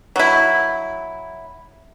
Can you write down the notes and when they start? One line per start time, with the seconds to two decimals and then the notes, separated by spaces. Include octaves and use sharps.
0.16 F#3 E4